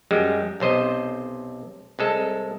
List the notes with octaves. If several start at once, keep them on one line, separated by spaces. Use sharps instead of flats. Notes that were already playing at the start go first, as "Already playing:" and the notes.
F#2 G3 G#3
B1 C3 C5 D#5
C2 G#3 A4